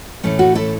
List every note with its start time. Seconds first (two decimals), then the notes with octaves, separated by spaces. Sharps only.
0.23 A2 E3 A3 C#4
0.39 F#4
0.55 E4 A4